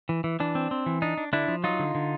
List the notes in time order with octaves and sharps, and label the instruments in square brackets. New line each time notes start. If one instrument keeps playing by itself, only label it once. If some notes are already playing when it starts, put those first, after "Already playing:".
[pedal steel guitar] E3
E3
E3 D4
C4
C4
E3
D4 D#4
D4
D3 D4 E4
F3
F#3 D#4 F4
D3
D3